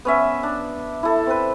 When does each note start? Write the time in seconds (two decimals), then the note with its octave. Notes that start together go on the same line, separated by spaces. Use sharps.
0.05 B3 C#4 E5
0.43 D4
1.03 E4 A4
1.27 C4 B4